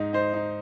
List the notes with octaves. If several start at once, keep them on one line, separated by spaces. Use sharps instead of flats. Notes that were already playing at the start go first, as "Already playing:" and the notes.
Already playing: G#2 D#4
D#4 C5
D#4